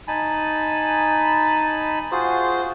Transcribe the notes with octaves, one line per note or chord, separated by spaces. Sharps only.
D#4 G#5 A5 B5
F4 F#4 G#4 C5